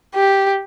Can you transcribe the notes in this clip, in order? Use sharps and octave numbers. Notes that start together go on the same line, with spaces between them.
G4